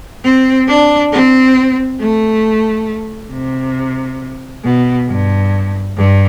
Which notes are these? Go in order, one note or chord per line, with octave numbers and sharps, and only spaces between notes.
C4
D4
C4
A3
C3
B2
G2
G2